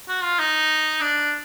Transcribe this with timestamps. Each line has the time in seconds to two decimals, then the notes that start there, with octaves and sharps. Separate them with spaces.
0.08 F#4
0.23 F4
0.39 D#4
1.01 D4